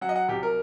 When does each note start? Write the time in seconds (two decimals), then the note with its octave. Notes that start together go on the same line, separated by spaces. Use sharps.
0.01 F#3 F#5
0.09 D#5
0.16 F#5
0.28 C2 G4
0.43 A#4